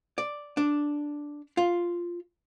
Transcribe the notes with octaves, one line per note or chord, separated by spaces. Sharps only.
D5
D4
F4